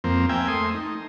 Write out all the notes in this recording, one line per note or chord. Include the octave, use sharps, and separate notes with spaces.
F2 A#3 C4
A#3 E5 G5 G#5
A3 C6 D#6
D#4